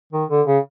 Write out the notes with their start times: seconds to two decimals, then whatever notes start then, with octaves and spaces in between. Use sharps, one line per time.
0.13 D#3
0.30 D3
0.47 C#3